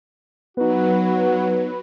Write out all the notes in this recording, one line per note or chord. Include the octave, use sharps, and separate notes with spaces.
F#3 B3 D#4 F#4 B4